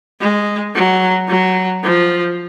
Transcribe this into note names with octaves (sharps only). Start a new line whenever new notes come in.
G#3
F#3
F#3
F3